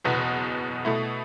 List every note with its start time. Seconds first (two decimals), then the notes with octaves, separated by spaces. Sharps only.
0.04 F#1 E2 B2 B3 F#4
0.85 B2 A3 E4